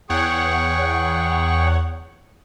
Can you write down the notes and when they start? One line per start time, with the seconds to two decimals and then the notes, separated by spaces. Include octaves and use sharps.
0.10 E2 G#4 C#5 F#5 G5 C#6